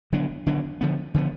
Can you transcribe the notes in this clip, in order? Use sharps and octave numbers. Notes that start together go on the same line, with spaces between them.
D3 F#3 B3 D4
D3 F#3 B3 D4
D3 F3 B3
D3 F3 B3